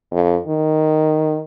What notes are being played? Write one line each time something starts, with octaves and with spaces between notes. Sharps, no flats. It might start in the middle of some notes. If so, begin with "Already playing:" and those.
F2
D#3